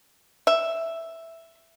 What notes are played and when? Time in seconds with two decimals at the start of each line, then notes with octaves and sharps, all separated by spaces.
0.47 E5